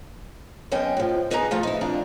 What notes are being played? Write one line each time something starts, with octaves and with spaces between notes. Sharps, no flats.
F#2 B3 C#4 D#5 G5
A2 F3
B2 B3 D#4 G#4 D5 A#5
F3 A3 F4
D#4 E4
F2 D4 A#5